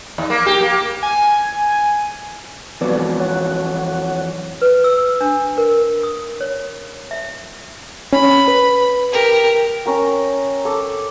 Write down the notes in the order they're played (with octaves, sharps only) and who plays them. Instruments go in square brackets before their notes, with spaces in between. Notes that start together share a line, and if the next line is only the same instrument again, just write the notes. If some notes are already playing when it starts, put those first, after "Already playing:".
[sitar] D#2
A#3
G4
A#3
[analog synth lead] G#5
[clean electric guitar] F2 E3 F#3 [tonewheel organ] B3 D5
[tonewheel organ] C#5 F#5
[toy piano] B4
E6
D4
A#4
D#6
C#5
E5
[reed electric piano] C#4 [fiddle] B5
[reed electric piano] B4
[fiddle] G4 A#4
[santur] C#4 A#4 G5
A4 D6